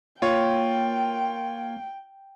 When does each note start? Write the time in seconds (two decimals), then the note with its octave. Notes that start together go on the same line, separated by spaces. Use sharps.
0.22 A#3 F4 C#5 G5